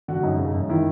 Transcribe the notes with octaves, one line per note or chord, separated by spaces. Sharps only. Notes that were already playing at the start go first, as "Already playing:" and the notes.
D3 F#4
F#2 D#4
C#3
F#2
D#3 E4